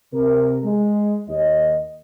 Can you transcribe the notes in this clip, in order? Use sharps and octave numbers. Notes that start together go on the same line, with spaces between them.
C3 A#4
G#3
D#2 D#5